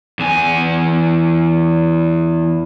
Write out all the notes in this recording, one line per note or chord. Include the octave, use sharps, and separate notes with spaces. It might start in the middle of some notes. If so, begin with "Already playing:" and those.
E2 G#5